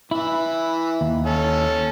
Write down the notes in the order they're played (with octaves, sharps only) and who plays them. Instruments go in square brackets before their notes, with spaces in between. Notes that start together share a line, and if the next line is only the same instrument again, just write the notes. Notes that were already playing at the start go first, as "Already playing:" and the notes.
[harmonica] E3 [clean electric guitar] E4
[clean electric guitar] D#2
[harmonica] C#4 A4